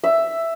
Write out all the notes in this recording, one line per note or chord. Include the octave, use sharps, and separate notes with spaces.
E5